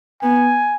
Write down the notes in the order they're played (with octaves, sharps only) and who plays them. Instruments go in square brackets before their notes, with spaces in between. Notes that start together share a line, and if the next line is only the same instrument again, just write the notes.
[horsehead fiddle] B3 [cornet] G#5